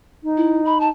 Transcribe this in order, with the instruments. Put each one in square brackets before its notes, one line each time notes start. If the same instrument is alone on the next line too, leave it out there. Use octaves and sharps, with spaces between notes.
[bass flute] D#4
[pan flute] E4
B5
A5